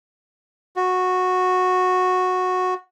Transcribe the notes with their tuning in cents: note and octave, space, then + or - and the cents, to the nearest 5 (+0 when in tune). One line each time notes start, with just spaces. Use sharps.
F#4 -10